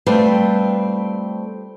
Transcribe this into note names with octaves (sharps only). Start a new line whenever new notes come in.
G3 A3 C4 F4 B4